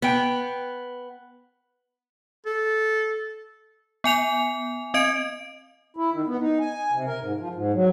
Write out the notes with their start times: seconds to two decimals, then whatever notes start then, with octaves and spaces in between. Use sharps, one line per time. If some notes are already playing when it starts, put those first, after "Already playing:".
0.02 B3 G5
2.46 A4
4.04 B3 G#5 F7
4.94 C4 D#5 D7
5.97 E4
6.13 D#3
6.27 B3
6.40 D#4
6.60 G#5
6.92 C3
7.07 A#4
7.22 G#2
7.39 F3
7.55 G#2
7.74 F#3